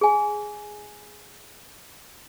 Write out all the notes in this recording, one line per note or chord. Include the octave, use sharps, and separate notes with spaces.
G#4 G#5